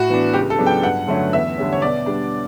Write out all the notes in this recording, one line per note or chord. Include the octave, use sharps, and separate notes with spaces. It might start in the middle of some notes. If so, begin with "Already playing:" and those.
Already playing: A2 F#4
E3 B3 D4
C#2 G4
A4
C#3 F#3 B3 D4
G5
G2 F#5
D3 F#3 A3 C#4
E2 E5
D3 G3 C#4
C#5
B2 D5
G3 D4